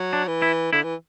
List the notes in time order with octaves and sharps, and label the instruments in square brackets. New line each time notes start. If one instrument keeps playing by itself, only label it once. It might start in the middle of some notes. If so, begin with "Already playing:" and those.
Already playing: [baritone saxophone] F#3
[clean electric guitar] D4
[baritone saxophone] E3
[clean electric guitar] E4
[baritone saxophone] D3 [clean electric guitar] E4
[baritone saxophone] E3